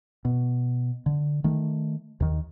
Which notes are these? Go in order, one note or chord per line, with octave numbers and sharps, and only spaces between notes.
B2
D3
D#3 A3
D#2 D#3